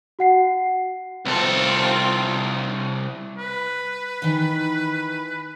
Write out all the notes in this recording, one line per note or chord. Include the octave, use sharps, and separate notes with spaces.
F#4 F#5 C7
C2 C4 F4 A4
B4
D#3 E3